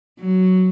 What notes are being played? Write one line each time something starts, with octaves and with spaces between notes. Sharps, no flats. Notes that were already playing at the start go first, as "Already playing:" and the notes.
F#3